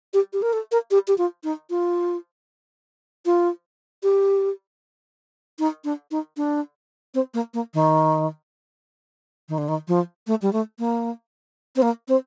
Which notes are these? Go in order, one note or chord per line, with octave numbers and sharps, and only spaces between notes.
G4
G4
A#4
A4
A#4
G4
G4
F4
D#4
F4
F4
G4
D#4
D4
D#4
D4
C4
A#3
A#3
D#3
D#3
D3
D#3
F3
A3
G3
A3
A#3
C4
A#3
C4